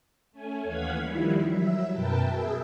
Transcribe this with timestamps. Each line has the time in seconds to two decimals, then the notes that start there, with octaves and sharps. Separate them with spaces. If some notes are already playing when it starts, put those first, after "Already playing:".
0.32 A3 C#4 G#5
0.64 D#2 E3 F5 F#5 G#6 B6
1.02 D#3 F3 G3 E4
1.42 F#3 E5
1.92 F#2 B2 A#4 B4 G5 A5
2.26 G#4 E5